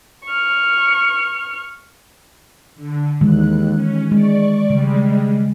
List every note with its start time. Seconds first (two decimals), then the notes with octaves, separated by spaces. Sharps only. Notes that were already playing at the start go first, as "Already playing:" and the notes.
0.25 C#6 F6
2.76 D3
3.21 D#2 D#3 E3 G#3 F#6
3.74 C#4
4.12 G#3 D5 C#6
4.70 C#3 G3 G#3